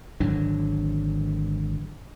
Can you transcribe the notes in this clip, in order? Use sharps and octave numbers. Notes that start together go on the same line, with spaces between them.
G#1 D3 F#3 D4